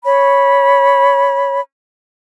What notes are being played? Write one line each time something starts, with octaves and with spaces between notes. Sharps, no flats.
C#5 B5